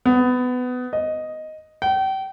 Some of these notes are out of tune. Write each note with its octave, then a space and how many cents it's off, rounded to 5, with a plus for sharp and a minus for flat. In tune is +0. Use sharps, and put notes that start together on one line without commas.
B3 +20
D#5 +0
G5 -35